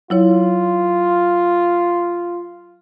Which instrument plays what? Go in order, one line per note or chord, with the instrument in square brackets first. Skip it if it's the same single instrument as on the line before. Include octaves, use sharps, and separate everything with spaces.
[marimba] F#3 E4 C#5 [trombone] F4